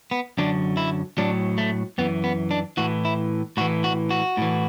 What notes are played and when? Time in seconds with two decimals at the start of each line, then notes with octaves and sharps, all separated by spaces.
0.11 B3
0.38 F#2 D3 F#3 D4
0.77 E4
1.18 A2 F#3 D4
1.58 A3
1.98 F#2 E3 B3
2.24 B3
2.51 D4
2.77 A2 E3 F#4
3.05 E4
3.57 A2 F#4
3.61 E3
3.84 F#4
4.11 F#4
4.37 A2 E3